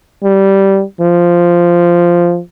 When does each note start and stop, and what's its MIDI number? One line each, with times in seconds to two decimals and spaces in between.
0.24 0.83 55
1.01 2.40 53